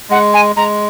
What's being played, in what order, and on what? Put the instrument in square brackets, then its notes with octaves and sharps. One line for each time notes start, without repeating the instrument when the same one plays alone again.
[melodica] G#3 [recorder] F#5
[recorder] G#5
[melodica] G#3 [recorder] A#5